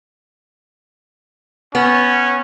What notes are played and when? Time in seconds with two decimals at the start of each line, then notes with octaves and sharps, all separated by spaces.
1.75 B3 C#4